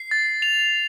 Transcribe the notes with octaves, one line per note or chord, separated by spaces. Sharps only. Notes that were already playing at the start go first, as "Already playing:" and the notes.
Already playing: C7
A6
F7